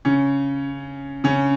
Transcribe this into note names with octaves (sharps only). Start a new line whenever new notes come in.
C#3 C#4
C#3 C#4